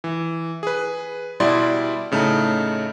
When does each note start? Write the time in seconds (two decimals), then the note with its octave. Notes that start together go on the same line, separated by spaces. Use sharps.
0.04 E3
0.63 G#4 B4
1.40 B2 G3 E4 D5 C6
2.12 A2 C#3 A3 D#4 A5